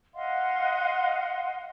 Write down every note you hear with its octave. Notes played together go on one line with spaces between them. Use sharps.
D#5 F5 F#5 C6